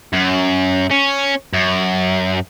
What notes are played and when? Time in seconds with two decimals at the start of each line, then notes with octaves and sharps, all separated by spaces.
0.13 F#2
0.91 C#4
1.54 F#2